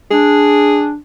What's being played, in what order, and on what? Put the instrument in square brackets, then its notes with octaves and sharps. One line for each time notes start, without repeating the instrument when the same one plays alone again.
[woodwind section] D4 [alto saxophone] G#4